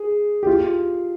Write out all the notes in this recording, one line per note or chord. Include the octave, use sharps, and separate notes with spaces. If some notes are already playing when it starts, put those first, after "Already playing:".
Already playing: G#4
G4
F4